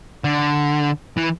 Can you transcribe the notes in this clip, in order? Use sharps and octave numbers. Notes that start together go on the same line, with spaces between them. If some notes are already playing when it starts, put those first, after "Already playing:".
D3
E3